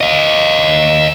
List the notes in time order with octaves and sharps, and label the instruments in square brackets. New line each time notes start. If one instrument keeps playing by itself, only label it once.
[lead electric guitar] D#5 F5